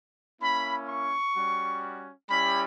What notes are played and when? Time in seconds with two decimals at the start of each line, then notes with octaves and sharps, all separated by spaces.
0.41 A#3 C#4 E4 B5
0.88 C#6
1.35 G3 C#4 F#4
2.30 G3 C#4 E4 G4 B5